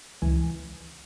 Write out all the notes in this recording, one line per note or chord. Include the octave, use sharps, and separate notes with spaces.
C#2 E3 G#5